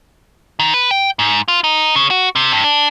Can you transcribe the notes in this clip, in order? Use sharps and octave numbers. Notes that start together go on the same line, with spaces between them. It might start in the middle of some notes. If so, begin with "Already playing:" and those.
D#3
B4
G5
G#2
F4
D#4
C#3
F#4
C3
G2
D4